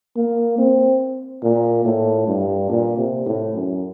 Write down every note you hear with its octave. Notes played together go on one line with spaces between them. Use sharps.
A#3
C4
A#2
A2
G2
A#2
C3
A2
F#2